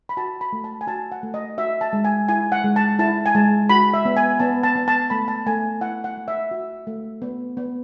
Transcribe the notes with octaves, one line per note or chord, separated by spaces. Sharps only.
B5
F#4 A5
B5
A3
A5
G#5
F#4 A5
F#5
A3
D#5
F#4 E5
A5
G#3
G#5
E4 G#5
F#5
G#3
A5
E4 A5
G#5
G#3 A5
F#4 B5
E5
B3
G#5
B3 A5
A5
B3
A5
A3 B5
A5
A3 G#5
E4 F#5
F#5
A3
E5
F#4
A3
B3
B3